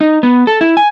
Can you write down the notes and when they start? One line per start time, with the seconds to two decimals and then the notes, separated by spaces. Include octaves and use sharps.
0.01 D#4
0.23 B3
0.47 A4
0.61 E4
0.77 G#5